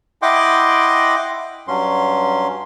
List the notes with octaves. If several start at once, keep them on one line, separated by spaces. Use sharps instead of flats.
E4 D#5 F#5 G5 C6 D6
G2 F#3 C#4 C6